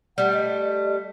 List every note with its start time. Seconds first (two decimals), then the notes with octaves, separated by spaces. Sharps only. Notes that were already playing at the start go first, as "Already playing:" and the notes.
0.18 G3 A3 F#5
0.33 D#5